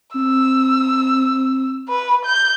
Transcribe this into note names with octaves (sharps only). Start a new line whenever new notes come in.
C4 E6
B4
G6